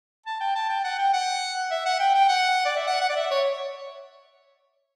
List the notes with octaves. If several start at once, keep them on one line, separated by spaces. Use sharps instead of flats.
A5
G5
A5
G5
F#5
G5
F#5
E5
F#5
G5
G5
F#5
D5
E5
F#5
F#5
D5
E5
C#5